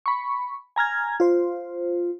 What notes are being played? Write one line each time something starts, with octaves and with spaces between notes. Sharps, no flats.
B5 C#6
G#5 A#5 F6 G#6
F4 C5